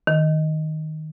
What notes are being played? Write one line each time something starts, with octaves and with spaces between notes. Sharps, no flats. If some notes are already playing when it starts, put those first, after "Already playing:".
D#3